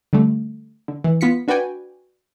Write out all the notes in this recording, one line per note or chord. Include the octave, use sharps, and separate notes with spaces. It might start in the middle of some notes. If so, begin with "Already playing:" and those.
D3 G3 A3
D3
E3
B3 F4 B6 C#7
D4 F#4 B4 D5 G5 G#5